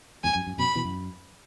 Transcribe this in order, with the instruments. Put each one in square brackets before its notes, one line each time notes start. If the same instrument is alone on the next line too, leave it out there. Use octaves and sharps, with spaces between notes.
[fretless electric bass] E2 G#2 [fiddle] G#5
[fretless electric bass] F#2
F#2
[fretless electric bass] F#2 B2 [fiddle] B5
[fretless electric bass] B2 E3
F#2